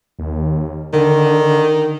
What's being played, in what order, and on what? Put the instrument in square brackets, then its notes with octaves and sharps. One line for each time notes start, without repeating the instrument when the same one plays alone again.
[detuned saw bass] D#2
[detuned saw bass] D3 [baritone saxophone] D#3